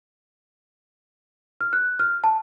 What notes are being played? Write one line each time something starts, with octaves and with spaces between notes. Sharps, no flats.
F6
F#6
F6
A5